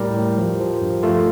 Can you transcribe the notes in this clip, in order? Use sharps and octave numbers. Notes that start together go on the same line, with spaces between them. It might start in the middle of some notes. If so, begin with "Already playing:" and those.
Already playing: A2 G3 G4 A#4
A2
F3
F3
G2
A3 F4 A4